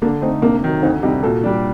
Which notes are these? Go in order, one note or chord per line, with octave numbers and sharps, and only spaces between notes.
D3 A#3 D4
A3 C4 D#4
C3 A#3 D4
D#3 F#3
D2 C4 D#4
C3 G3 D#4 G4
A#2 F#4 A4
G3 D4